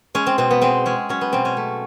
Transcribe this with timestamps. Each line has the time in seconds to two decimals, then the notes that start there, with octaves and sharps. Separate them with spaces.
0.15 G#3 C#4
0.27 C4
0.38 B2 C4
0.51 B3
0.61 G#3 C4
0.86 G#3 C#4
1.09 F#3 C#4
1.21 B3
1.33 B2 C4
1.45 C#4
1.57 A3